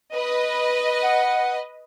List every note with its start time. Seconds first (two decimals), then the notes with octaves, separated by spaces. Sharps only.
0.15 B4 D#5
1.03 F#5